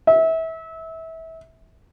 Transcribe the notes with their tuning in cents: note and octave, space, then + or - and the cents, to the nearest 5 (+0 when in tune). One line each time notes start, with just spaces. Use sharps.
E5 -25